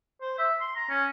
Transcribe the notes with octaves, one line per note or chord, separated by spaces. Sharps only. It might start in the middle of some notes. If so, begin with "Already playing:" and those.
C5
E5
C6
A#5
C#4